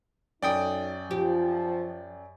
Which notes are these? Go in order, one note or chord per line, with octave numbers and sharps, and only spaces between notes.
F#2 F#3 D#4 A4 D5 G5 D#6 D7
F3 G4